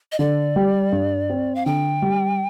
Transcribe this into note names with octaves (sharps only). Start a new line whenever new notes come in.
D#5
D3 D5
G3
G2
C4
F5
D3 G5
G3